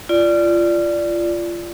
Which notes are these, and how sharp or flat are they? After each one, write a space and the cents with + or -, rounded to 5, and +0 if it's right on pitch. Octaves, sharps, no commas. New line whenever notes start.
F4 -25 D5 +0